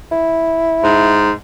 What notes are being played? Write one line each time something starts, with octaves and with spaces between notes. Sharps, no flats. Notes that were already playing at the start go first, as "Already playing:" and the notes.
E4
G#2